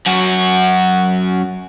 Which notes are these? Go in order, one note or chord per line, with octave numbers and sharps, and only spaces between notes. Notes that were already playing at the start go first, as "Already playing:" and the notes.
F#2 F#4